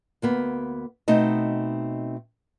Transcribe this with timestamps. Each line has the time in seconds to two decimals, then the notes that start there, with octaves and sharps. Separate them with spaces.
0.22 D2 A#3 B3
1.08 B2 A3 C4 D#4 D#5